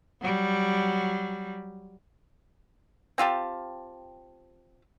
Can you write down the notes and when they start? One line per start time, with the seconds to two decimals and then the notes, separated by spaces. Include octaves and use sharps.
0.21 F#3 G3
3.18 C4 F4 G4 A5